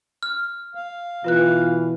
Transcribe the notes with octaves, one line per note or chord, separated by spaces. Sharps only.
F6
F5
B2 E3 F4 B4 F#6